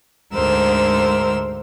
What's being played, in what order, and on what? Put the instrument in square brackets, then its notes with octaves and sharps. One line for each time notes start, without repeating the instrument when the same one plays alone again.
[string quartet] D2 G#2 D3 A#4 C5 E6